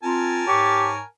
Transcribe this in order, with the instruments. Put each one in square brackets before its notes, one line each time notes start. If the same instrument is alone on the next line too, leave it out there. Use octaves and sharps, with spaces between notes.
[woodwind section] C4 F4 [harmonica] A#4 G#5 A5
[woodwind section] G#2 C#5 C#6 [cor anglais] G4